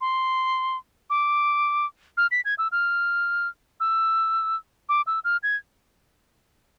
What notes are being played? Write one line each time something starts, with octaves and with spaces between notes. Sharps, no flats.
C6
D6
F6
B6
G#6
E6
F6
E6
D6
E6
F6
G#6